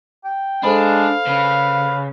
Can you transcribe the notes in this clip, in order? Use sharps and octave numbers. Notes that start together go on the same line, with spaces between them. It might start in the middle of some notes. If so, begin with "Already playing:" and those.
G5
G#3 D4 A4 C5 F5 B5
C#3 B4